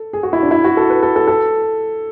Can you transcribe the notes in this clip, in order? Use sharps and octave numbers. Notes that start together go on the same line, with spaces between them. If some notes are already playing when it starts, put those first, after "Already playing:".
Already playing: A4
G#4
F#4
E4
D4
E4
F#4
A4
B4
A4
A4
A4